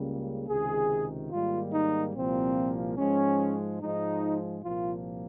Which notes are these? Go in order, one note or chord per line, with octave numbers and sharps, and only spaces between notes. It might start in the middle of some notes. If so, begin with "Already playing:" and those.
Already playing: C#2 C#3 G3 A#3
C#2 C3 D#3 G#4
G#2 D#3 G3 A#3 F4
D#4
C2 A#2 F3 A#3 C4
G#2 F3 G#3 C#4
G#2 F3 G#3 D#4
C2 A#2 F3 A#3 F4